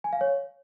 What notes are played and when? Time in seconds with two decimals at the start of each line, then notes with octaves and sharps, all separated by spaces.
0.04 G#5
0.13 F5
0.21 C#5